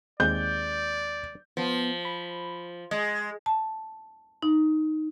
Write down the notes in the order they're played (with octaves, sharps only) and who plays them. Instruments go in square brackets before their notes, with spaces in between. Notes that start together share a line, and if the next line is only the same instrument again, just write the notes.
[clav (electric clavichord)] D#2 G#3 C4 [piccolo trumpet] D5 [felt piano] G6
[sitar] F3 [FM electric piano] B3
[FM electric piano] B5
[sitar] G#3 [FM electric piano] D#5
[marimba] A5
D#4